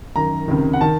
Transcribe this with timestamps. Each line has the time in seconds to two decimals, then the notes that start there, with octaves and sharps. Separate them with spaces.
0.16 F#2 D#3 A#5
0.48 C#2 C3 D#3
0.73 F#5
0.81 D#3 A5